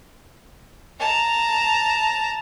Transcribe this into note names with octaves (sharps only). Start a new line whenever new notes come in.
A5 A#5